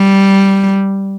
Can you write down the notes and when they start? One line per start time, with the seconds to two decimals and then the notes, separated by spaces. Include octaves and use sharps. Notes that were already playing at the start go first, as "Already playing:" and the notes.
Already playing: G3